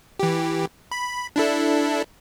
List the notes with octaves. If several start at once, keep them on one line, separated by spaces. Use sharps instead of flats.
E3 G4
B5
D4 E4 A4